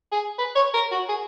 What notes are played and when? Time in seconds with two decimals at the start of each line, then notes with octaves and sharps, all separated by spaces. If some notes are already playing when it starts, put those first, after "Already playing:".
0.12 G#4
0.39 B4
0.56 C#5
0.74 A#4
0.92 F#4
1.09 G#4